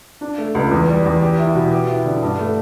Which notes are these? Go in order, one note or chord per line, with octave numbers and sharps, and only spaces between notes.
D4
A3
C#2
E2
G3
E2
G4
E4
B2
G4
E4
D3
G2
A3